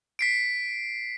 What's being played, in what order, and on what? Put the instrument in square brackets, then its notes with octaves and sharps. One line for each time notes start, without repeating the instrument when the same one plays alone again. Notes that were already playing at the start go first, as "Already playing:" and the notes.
[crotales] B6 C7 D7